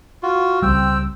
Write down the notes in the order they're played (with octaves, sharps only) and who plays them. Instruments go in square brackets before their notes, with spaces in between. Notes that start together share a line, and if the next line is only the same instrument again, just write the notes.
[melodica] F4 F#4
[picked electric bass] C#2 G3 [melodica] C4 G5 E6